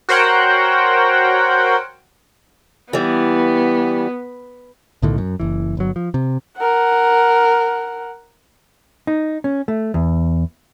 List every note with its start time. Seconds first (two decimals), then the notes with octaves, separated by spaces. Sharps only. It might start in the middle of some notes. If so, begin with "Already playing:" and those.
0.09 F#4 A#4 C5 C#5 F#5 G5
2.93 E3 G3 B3
5.02 B1 A2 D3 D#3
5.18 F#2
5.40 F#1 E3
5.77 G1 F#3
5.96 F3
6.14 C3
6.58 A#4 F#5
9.07 D#4
9.44 C#4
9.68 A3
9.94 E2